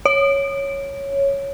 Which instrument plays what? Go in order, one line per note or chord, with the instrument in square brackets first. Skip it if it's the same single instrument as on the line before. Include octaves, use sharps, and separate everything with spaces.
[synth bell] C#5